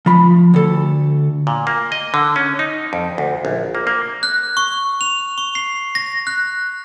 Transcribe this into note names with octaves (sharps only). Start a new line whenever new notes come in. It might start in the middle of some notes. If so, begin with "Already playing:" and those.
F3 B5
D2 A4
A#2
A#3
D#5
D3
C#4
D#4
F2
D2
A#1
A#3
A#3
F#6
C#6
F7
C#6
C7
A#6
F#6